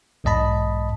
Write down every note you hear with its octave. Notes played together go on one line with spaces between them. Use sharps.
B1 E2 G#2 D#5 A5 B5